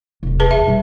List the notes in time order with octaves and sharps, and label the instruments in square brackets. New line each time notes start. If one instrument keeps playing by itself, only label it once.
[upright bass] E1 C2
[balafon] G#4 B4 A5
[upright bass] E2 [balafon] E5
[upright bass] B2 G3